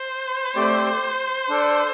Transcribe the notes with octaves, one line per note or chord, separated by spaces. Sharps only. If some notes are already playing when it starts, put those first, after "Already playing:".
Already playing: C5
A3 C4 G4 D5
D4 A4 D5